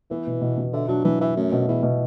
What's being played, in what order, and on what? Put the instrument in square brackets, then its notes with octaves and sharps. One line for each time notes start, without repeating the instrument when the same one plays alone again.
[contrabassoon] E3 [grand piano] B3
[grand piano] B2
B2
B2
[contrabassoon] D3 [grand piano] E5
[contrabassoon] F#3 [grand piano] D4
[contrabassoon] E3 [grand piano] F#3
[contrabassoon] E3 [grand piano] E5
[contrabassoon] F#2 [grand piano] A3
[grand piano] B2
[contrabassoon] E2 [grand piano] E4
[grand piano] B2